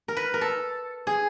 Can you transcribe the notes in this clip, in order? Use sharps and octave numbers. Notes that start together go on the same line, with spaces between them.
A#4
B4
A#4
A4
G#4